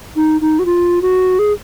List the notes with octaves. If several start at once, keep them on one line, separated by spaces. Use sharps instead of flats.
D#4
D#4
F#4
F4
F#4
G#4